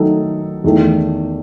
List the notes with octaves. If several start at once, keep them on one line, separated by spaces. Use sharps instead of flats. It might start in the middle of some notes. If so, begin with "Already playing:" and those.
Already playing: D#3 F#3 A3 D#4 A4
E2 D#3 A3